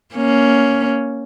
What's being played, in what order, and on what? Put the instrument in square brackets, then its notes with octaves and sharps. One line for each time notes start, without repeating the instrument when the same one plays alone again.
[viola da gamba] A#3 C#4